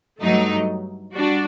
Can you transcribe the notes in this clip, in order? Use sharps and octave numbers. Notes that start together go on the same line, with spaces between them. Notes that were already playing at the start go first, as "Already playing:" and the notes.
G2 F#3 A3 D#4
G3 D4 F#4